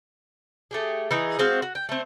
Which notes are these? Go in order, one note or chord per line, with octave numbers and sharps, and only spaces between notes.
A3 G4 G#4
E3 D#4 G#4
G#3 C4 F#4 F5
F#4
G5
A3 C4